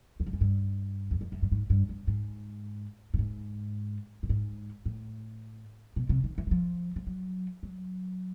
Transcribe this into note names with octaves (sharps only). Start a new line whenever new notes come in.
E2
F2
F#2
G2
E2
F2
F#2
G2
G#2
G2
G2
G#2
A2
G#2
A2
G#2
A2
B2
C3
D#3
E3
F#3
F3
F3
F#3
F#3